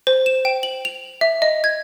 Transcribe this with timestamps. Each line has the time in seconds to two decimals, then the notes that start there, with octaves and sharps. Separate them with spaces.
0.07 C5
0.26 E7
0.45 G5
0.63 F#7
0.85 F7
1.21 E5
1.42 D#5
1.64 G#6